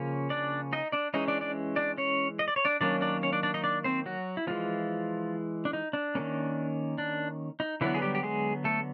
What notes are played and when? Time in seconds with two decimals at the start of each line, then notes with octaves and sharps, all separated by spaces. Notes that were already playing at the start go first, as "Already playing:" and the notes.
Already playing: C#3 F3 A#3 C#4
0.30 D4 D5
0.73 D#4 D#5
0.92 D4 D5
1.14 E3 G#3 C#4 D#4 D#5
1.28 D4 D5
1.41 D4 D5
1.76 D4 D5
1.97 C#4 C#5
2.39 D#5
2.48 D5
2.56 C#5
2.65 D4 D5
2.81 D#3 F#3 A#3 C#4 D4 D5
3.01 D4 D5
3.23 C#4 C#5
3.33 D4 D5
3.43 D4 D5
3.54 D#4 D#5
3.64 D4 D5
3.84 C4 C5
4.06 F#3 F#4
4.37 E4
4.47 E3 F3 G#3 B3 F4
5.65 D4
5.73 D#4
5.93 D4
6.15 D#3 G3 A#3 C#4
6.98 D4
7.60 D#4
7.81 D3 E3 F#3 B3 E4
7.94 G#4
8.02 G3 G4
8.15 G4
8.23 G#3 G#4
8.64 A3 A4